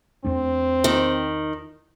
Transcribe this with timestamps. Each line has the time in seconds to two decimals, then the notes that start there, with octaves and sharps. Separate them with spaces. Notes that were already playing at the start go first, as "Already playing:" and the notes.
0.25 E2 A3 C4 D4
0.84 D#3